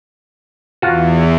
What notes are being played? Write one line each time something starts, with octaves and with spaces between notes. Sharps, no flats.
E2 F4 F#4